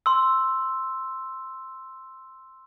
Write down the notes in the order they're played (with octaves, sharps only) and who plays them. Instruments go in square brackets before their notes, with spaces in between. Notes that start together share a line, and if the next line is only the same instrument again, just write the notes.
[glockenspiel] C6 E6